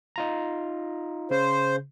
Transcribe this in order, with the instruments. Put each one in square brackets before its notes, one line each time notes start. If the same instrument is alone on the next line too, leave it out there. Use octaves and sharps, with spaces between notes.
[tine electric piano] D#4 F4 A#5
[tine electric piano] C#3 [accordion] C5